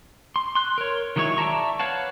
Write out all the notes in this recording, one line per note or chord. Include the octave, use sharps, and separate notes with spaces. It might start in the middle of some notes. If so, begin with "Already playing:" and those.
C6
C6 F#6
A#4 C#5
D#3 F#3 G#3 E4 C#5
D5 E5 A5 A#5 C#6
B4 C#5 F5 F#5 A5